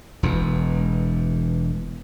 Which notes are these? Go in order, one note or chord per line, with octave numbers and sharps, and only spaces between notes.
E1 E2